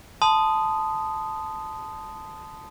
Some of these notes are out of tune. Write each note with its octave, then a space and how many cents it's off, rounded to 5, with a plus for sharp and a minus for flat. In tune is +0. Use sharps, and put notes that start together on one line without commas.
A5 -10 C6 -35 D#6 -5